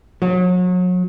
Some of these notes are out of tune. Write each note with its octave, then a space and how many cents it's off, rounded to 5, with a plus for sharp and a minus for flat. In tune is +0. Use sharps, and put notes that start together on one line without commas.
F#3 -35